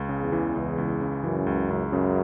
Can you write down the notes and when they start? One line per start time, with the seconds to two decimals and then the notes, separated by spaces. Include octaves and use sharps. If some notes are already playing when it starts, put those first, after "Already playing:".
Already playing: C#2
0.09 C#3
0.21 E2
0.32 E3
0.55 C#2
0.78 C#2
1.01 C#3
1.24 F#2 E3
1.47 C#2
1.70 C#2
1.93 F#2 C#3